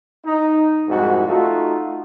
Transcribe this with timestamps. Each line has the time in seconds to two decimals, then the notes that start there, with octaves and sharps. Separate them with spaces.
0.25 D#4
0.88 C2 F2 G#2 F#4
1.26 A3 D#4 F4 F#4